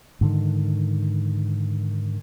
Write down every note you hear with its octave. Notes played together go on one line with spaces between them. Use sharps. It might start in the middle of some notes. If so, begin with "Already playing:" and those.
G#2 D3 D#3